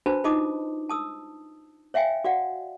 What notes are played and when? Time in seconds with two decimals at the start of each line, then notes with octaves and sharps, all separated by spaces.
0.06 D4 F#4 B4 C5 A5 B5
0.24 D#4 F4 D#5 A5 D6 D#6
0.89 A5 D#6 E6
1.94 C#5 E5 F5 G5 G#5
2.24 F#4 D5 F5 F#5